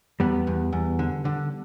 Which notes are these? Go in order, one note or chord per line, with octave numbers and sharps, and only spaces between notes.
E2 G3 B3
E2
E2
D3
D3